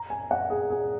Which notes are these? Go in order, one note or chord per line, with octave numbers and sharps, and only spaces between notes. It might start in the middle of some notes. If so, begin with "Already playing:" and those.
Already playing: A#5
G#5
F#5
G#4
G#4